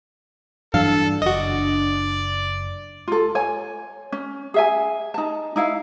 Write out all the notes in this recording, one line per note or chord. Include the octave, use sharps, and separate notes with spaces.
G2 E3 F#3 D4 A4 F5
F#1 F#4 D5 D#5
F4 A4
C#5 G#5
C#4
G#4 E5 G#5
D#4 A5
D#4 E4 F5